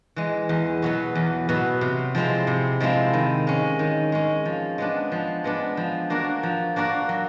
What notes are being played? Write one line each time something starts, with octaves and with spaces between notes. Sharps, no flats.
E3 G#3
E2
B2 F#3 B3
E2
B2 F#3 B3
C3
F3 G#3 C4 E4
C3
F3 G#3 C4 E4
D#3
G#3 C#4
D#3
G#3 C#4
F3
G#3 B3 D4
F3
G#3 B3 D4
F3
A#3 D4 F#4 A#4
F3
A#3 D4 F#4 A#4
F#3